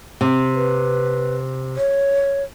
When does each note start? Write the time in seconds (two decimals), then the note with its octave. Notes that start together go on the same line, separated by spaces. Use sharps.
0.21 C3
0.55 B4
1.76 C#5